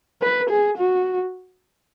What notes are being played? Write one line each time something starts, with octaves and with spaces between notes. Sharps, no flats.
B4
G#4
F#4